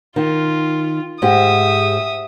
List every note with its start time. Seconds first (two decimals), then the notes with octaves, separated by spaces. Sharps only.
0.16 D#3 F4
1.22 G#2 G4 E5 D#6